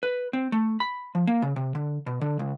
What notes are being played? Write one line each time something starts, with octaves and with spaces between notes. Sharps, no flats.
B4
C4
A3
B5
F3
A#3
C#3
C3
D3
B2
D3
C#2